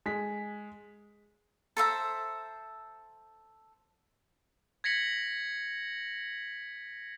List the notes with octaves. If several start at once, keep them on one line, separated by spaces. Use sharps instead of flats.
G#3 B6
A4 C5 E5 A#5
G#6 A#6 B6 C#7 F#7